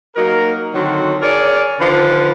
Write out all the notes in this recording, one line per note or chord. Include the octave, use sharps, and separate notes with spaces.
F#3 A#3 D#4 A#4
D3 D#3 F#3 C4 F#4
G#4 A#4 C#5 D5
D3 D#3 F3 B4 F5